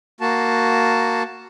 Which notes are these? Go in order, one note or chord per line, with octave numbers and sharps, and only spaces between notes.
A#3 F#4 A5